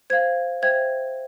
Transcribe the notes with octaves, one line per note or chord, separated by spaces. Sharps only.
C5 F5 G#6
C5 E5 G5 G#6